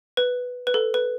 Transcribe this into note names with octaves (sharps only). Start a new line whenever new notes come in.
B4
B4
A4
B4